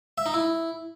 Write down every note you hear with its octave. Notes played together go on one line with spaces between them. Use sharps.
E5
D#4
E4